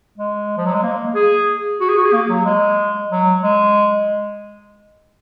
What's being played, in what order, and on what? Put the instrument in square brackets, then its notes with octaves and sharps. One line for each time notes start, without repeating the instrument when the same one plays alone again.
[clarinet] G#3
F3
F#3
G#3
A#3
G#4
F#4
G#4
F#4
G#4
A#3
F#3
G#3
F#3
G#3